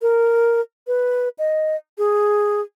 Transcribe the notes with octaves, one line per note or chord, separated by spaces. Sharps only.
A#4
B4
D#5
G#4